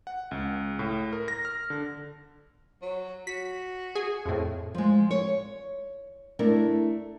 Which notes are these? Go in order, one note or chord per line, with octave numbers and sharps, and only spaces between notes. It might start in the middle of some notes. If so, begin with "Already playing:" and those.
F#5
C#2
A2
A#4
A#6
F6
D3
F#3
F#4 B6
G#4
F2 A2
F3 G#3
C#5
A3 D4 E4 A#4